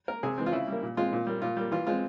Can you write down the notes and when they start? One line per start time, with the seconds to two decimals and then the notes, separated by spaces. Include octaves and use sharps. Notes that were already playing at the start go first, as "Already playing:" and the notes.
0.08 A#3 A#4
0.23 C3 G#4
0.38 E3 G#3 C4
0.46 F4
0.52 C#3 E4
0.68 G3 A#3
0.83 A#2
0.97 G#3 C4 F4
1.13 A#2
1.27 G3 A#3
1.42 A#2 F4
1.57 G3 A#3
1.71 E3 F4
1.87 G#3 C4 F4